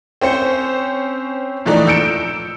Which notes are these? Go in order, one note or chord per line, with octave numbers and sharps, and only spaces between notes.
C4 C#4 C5 C#7
A#2 E3 F3 A3 D4 D#4
E6 G6 C#7 D7 E7